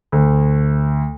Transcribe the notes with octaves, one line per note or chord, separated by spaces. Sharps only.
D2